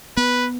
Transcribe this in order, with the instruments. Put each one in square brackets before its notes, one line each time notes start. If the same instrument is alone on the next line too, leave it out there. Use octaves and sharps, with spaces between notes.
[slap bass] B3 [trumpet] B4